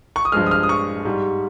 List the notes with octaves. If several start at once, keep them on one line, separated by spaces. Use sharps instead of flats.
C#6
D#6
G2 F3 G#3 F6
D#6
F6
D#6
C#6
G#2 G3